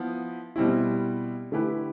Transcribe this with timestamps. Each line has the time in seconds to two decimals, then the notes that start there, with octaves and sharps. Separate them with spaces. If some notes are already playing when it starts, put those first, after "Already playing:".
Already playing: F3 B3 E4
0.56 B2 G3 C4 E4
1.52 D3 A3 E4 G4 B4